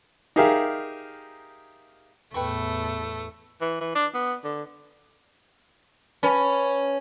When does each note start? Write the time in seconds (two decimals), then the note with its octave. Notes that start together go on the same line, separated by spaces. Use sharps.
0.36 D#4 G4 G#4 A#4 E5 F5
2.34 E2 A2 A3 B4 G5 C#6
3.61 E3
3.81 E3
3.95 D4
4.14 B3
4.44 D3
6.23 C#4 B4 A5 B5